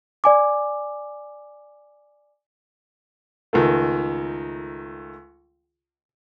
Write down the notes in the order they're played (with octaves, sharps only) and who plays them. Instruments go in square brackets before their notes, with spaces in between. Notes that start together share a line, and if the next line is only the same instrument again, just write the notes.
[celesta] D5 G#5 D6
[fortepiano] C#2 D#3 A3